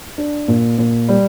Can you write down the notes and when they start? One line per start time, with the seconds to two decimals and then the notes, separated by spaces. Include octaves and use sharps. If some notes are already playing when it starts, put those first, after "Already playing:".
0.18 D4
0.48 A#2
0.78 A#2
1.09 G3